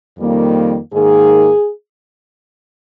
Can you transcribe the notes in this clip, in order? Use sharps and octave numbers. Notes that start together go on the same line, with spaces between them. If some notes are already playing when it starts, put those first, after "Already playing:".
F2 D#3 G3 A#3
G#2 D#3 A#3 G#4